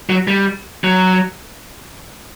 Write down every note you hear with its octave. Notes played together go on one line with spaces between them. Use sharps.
F#3
G3
F#3